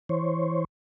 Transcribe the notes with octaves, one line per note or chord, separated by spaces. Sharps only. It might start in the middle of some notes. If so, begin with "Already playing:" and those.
E3 C5 C#5